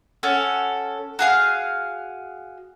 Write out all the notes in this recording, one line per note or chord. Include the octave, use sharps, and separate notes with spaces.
C#4 F#4 A4
F#4 G#4 F5